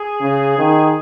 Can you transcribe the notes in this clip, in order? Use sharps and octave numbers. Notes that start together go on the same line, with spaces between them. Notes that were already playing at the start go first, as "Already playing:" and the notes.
Already playing: G#4
C#3
D#3
G#4